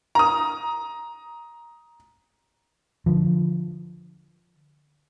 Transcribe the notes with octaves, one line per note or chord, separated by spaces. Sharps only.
A#5 D#6
D3 F3